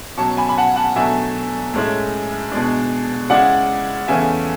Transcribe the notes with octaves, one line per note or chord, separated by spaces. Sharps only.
B2 F#3 C#4 A5 C#6
G#5 B5
B5
F#5 A5
F#5 A5
B2 F#3 A3 D4 E5 G#5
A2 G#3 C#4 E4
B2 G#3 D4
C#3 G#3 C#4 E4 D5 F#5
E2 C#3 E3 A3 C#4 E5 G#5